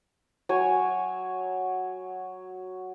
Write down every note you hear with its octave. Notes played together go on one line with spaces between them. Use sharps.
F#3 C#5 G#5